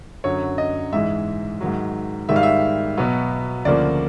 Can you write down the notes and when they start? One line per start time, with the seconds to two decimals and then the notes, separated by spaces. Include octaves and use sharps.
0.24 F#2 D3 F#3 C#5
0.58 D#5
0.92 G#2 E3 G#3 E5
1.61 G#2 D#3 F#3
2.29 G#2 D#3 G3 E5
2.36 F5
2.43 E5
2.97 B2 F#3 B3
3.65 D2 C#3 F3 A#3 D5